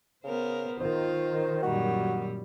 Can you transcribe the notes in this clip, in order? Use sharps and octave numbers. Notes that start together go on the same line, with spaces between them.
C#3 B3 A#4 C5
D#3 F4 C5
F#2 A#2 G3 F#4